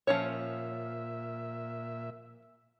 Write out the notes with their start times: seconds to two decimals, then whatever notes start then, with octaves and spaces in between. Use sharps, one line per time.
0.07 A#2 F3 C#4 C#5 E5